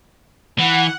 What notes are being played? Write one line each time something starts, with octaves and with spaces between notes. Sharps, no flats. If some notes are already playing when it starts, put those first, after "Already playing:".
E3 F#5